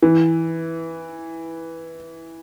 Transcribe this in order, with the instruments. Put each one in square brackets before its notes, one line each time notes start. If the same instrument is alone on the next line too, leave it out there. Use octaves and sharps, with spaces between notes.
[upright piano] E3